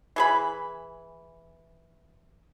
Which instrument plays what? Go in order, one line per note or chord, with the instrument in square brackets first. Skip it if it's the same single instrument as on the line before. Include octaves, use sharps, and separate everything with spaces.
[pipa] E3 G#4 B5